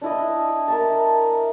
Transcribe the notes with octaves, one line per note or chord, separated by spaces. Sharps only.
D4 E4 D#5
A#4 E5 A5